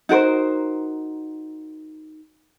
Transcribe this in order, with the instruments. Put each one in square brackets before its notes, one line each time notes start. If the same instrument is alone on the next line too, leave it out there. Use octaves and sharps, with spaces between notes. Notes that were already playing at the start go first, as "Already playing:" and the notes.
[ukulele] D#4 F#4 A#4 C5